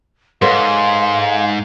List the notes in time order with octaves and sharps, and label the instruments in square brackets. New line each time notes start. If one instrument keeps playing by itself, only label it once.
[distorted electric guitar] G#2 [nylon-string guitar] A4 B4 C#5 [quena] F5 [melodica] C6